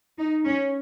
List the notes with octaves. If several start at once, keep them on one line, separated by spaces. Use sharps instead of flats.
D#4
C#4